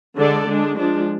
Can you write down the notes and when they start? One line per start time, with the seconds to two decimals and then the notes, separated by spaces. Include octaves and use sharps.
0.17 D3 G#3 D4 A4 D5
0.47 D3 G#3 D4
0.77 F3 G#3 D4